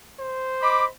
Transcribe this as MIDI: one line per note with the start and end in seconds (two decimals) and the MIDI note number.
0.19 0.89 72
0.62 0.85 75
0.62 0.85 83
0.62 0.85 86